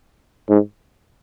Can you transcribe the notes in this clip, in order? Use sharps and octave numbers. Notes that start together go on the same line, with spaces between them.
G#2